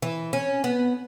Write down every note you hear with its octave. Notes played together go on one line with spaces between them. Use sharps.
E3
C#4
B3